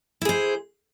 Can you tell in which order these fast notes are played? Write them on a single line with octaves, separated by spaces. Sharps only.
E4 G#4 C5